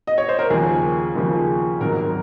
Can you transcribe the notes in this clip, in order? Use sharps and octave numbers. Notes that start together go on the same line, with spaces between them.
D#5
C#5
C5
A#4
D#2 C#3 F3 G#4
D#2 C#3 F3
G#1 G#2 F#3 A#4